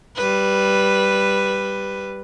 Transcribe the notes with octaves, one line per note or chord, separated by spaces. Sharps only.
G3 B4